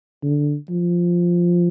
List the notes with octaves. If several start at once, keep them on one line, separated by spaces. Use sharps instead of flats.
D3
F3